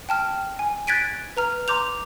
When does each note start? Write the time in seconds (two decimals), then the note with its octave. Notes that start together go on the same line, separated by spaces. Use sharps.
0.09 G5 A5 F6
0.59 G#5
0.87 F#6 G#6 A6 B6 D7 D#7
1.37 B4 A#5 F6
1.68 A#5 C6 D6 G6 F7